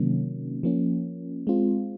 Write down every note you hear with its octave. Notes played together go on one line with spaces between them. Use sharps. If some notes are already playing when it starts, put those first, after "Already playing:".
Already playing: C3 D#3 F#3 A#3 C#4
F3 A#3 C#4
G#3 C4 F4